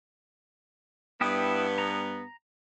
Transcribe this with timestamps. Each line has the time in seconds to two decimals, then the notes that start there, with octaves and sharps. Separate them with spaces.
1.21 G2 B3 E4 G5 D#6
1.78 A#5